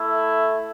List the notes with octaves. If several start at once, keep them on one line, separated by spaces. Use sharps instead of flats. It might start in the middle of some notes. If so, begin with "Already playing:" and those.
Already playing: A3 E4